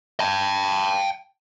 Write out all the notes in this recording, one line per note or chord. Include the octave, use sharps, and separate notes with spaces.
G5 A5